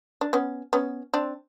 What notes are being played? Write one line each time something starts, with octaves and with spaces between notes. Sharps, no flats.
D4
B3 C#4
B3 C#4
C4 D4